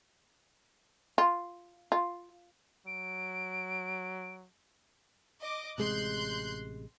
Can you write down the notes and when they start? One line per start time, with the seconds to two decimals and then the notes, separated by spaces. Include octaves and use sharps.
1.18 F4
1.92 F4
2.87 F#3 D7
5.42 D#5 D6
5.78 A1 C3 G#3 C6 F#6 G6